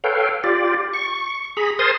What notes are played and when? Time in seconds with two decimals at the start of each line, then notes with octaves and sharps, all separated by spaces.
0.04 A4 B4 C#5 F5 G5
0.44 F4 G4 D5
0.94 C#6
1.57 G#4 A#5 B5
1.79 A#4 C5 G#5 A5 C6 D#6